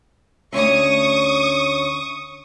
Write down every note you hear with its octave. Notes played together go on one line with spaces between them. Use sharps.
D2 C#4 E5 C#6 D#6